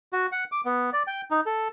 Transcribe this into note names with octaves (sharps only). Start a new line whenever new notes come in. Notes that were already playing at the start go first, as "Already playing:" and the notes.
F#4
F#5
D6
B3
D5
G5
D#4
A4